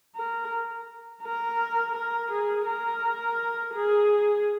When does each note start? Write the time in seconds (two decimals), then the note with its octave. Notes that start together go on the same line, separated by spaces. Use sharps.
0.16 A#4
1.23 A#4
1.94 A#4
2.31 G#4
2.66 A#4
3.74 G#4